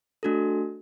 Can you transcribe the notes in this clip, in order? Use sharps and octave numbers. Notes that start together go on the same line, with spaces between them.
A3 D4 F#4 A4